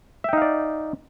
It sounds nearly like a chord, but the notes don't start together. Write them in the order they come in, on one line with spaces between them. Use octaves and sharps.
E5 G5 D#4 F5 D5